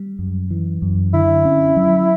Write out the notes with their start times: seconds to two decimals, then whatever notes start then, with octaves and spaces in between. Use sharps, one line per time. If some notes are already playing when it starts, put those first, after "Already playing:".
Already playing: G3
0.19 F#2
0.51 E3
0.82 F#2
1.14 D3 E4
1.45 C#4
1.76 F#3